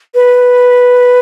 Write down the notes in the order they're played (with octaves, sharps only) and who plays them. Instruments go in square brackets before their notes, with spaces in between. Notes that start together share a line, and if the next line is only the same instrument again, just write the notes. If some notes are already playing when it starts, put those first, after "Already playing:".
[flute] B4